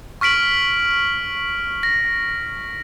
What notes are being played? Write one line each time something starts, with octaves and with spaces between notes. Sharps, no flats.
C#6 F6 B6 D7 F#7
A#6